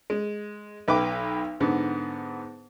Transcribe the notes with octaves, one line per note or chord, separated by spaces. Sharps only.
G#3
B1 B4 G5 D6
G#2 D3 B3